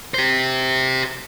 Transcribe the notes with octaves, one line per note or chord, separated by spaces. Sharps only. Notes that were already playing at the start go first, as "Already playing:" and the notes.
G4 C5